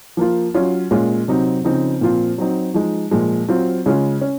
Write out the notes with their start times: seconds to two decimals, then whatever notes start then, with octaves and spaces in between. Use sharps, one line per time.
0.17 F3 A#3 F4
0.54 F#3 C#4 F4
0.91 A#2 G#3 C#4 F4
1.28 C3 F#3 C4 D#4
1.64 C#3 F3 C4 D#4
2.01 A#2 F3 C4 F4
2.38 F#3 C4 D#4
2.74 F3 G#3 D#4
3.11 A#2 F3 G#3
3.48 F#3 C4 F4
3.86 C#3 G#3 C#4 F4
4.21 C#4